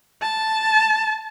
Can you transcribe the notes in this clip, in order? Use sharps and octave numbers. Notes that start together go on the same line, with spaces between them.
A5